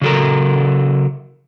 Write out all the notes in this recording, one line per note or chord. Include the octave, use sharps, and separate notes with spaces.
C#3 F#3 A4 A#4